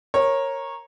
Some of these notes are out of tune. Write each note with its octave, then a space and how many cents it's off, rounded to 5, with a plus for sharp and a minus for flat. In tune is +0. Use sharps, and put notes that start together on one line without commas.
A#4 +5 C#5 -20